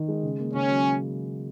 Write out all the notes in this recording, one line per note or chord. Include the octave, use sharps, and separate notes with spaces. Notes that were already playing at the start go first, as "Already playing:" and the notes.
Already playing: D#3 D#4
G#3
C#3
A#3
C#3 C#4
F#3